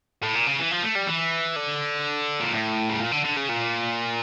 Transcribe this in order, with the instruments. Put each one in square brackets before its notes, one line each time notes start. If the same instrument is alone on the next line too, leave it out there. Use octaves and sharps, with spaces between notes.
[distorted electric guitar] A2
A#2
C#3
E3
F3
A3
G3
E3
D3
A#2
A2
C#3
A#2
D3
D3
C#3
A#2